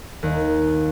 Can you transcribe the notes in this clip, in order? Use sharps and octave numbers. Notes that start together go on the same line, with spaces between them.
D#2